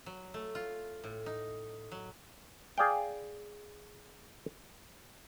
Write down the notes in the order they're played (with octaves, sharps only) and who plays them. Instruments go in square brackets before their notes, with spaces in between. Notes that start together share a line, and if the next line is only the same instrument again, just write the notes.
[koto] F#3
A3
F4
A2
D#4
F#3
[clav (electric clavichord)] G#4 D5 F5 G5